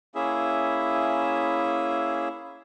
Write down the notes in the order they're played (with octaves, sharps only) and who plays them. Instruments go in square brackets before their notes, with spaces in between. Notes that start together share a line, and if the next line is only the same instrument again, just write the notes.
[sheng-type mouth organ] A#3 C#4 E4 G#4 E5